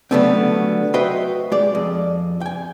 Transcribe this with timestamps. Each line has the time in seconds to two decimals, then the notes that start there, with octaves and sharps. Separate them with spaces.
0.11 D3 F#3 G3 A3 B3 C4
0.94 F#4 B4 C5 D#5 E5 G5
1.52 G#3 G4 D5
1.75 F2
2.41 G5 G#5